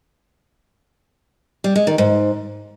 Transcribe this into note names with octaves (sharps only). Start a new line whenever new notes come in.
G3
G#3
D#3
G#2